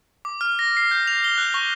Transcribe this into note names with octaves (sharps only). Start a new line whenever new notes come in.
D6
F6
A#6
C7
G6
F7
G7
F#6
C#6